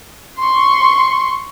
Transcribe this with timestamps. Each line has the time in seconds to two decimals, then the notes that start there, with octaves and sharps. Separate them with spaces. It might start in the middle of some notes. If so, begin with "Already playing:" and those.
0.39 C6 C#6